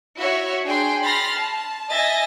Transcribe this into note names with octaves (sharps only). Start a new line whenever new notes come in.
E4 F#4 C#5 E5
D4 G#4 G5 C6
B5 C6 F6 A6 A#6
A5
D#5 E5 G#5 A6 A#6